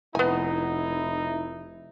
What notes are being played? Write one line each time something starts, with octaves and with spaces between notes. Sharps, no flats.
F1 B3 D#4 E4 G#5